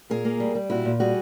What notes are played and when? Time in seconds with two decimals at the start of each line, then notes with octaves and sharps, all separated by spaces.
0.10 A#2 G#4 A#4
0.25 A#3
0.40 G3
0.55 G3
0.70 A#2 E4 F#4
0.85 A#2
1.00 G3 F#4 G#4